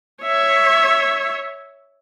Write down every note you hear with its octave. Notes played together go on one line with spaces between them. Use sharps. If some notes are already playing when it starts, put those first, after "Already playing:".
C#5 E5